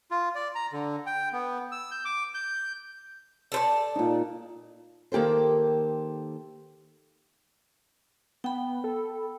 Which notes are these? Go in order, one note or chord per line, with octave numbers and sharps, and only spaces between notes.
F4
D5
A#5
D3
G5
B3
E6
G6
D6
G6
A4 C5 D5
A#2 D#4
D#3 A#3 G4 A4 C5
B3 G5 B5
A4